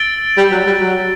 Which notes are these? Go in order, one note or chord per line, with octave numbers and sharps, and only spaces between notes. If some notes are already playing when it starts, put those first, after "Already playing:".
Already playing: E6 A6 D7 G7
G3
F#3
G3
F#3